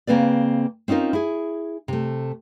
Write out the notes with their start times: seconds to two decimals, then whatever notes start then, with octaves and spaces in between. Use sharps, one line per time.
0.07 C#3 A#3 C4 B4 D5
0.88 C4 C#4 D#4 F4 A#4
1.13 E4 G#4
1.88 C3 A3